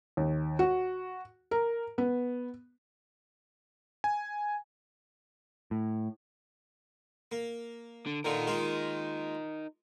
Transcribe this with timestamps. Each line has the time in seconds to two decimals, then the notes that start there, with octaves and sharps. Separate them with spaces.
0.17 D#2
0.59 F#4
1.51 A#4
1.98 B3
4.04 G#5
5.71 A2
7.32 A#3
8.06 D3
8.24 A#2 D3 F3 D#4 A#4
8.47 G#3 A#3 F4